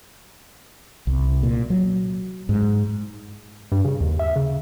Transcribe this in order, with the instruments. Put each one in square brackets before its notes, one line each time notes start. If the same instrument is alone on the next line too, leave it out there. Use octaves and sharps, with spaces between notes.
[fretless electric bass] C2
A#2
F#3
G#2
[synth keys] G2
C#3
D#2
E5
C#3